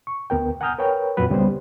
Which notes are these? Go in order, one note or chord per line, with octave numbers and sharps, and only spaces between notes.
C#6
D2 B3 A#4 G5
F#5 G#5 A#5 D#6 F6 G6
A#4 B4 C#5 G5
F2 A#2 F#3 B4 F#5
C#2 C#3 G3 A#3 B3 C5